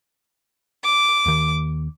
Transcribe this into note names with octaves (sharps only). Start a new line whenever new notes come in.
D6
D#2 D#3